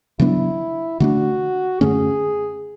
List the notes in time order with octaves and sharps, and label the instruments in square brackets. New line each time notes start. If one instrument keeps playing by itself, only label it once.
[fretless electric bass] C#3 F#3 B3 D4 [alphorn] E4
[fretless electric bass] D3 A3 D4 [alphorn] F#4
[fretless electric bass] F#2 D3 A3 C#4 [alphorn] G#4